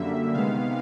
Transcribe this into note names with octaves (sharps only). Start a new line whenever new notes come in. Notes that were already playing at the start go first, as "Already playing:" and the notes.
Already playing: F#2 D3 G3 A#3 E5
C3 D#3 G#3 B3 F5